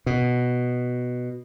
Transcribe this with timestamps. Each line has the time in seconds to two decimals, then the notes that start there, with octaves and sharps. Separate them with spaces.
0.06 B2